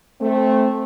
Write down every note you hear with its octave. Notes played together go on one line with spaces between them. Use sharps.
A3 C4